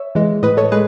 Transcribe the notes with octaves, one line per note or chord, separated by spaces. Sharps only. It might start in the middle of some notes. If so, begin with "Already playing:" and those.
Already playing: C#5 E5
E3 G#3
A2 B4 D#5
A4 C#5
G#3 G#4 B4